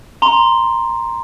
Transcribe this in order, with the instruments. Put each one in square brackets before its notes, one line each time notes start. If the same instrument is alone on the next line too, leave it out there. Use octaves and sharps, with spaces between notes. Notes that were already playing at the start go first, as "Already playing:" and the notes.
[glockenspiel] A#5 C6